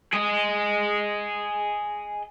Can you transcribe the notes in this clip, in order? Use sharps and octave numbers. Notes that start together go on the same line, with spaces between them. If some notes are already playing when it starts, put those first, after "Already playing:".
G#4 D#5